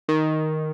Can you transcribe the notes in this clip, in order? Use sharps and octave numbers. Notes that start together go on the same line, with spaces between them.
D#3